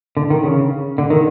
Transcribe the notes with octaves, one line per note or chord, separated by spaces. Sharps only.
D3
D#3
C#3
D3
D#3